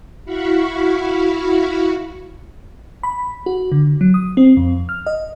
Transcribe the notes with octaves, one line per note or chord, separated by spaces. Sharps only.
E4 F#4 F5 B5 C#6
B5
F#4
D3
F#3
D#6
C4
F2
F6
D#5